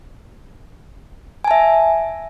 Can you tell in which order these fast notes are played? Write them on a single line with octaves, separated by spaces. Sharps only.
G#5 A5 E5